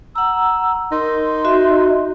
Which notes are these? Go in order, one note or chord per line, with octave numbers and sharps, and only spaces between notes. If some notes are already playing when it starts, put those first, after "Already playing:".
F#5 A#5 E6
D#4 A#4 C6
F#4 D#5 E5